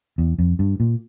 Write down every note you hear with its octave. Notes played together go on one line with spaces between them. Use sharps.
E2
F2
G2
A#2